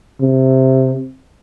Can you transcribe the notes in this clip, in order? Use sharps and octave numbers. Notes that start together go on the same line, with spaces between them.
C3